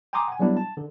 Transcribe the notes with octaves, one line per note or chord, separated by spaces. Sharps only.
G5 G#5 A#5 C6 D6 D#6
F#5 G#5
F#3 G3 B3 D4 E4
A5
D3